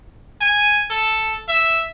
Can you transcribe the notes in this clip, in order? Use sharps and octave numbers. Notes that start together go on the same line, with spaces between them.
G#5
A4
E5